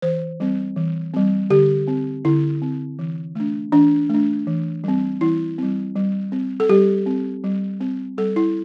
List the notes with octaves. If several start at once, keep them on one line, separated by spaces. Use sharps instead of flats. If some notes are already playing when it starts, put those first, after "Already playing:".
E3 C5
G3 C4
E3
G3 C4
D3 G4
C4
D3 E4
C4
E3
A3 D4
E3 D4
A3 D4
E3
G3 C4
E3 E4
G3 C4
G3
C4
A4
G3 G4
C4
G3
C4
G3 A4
E4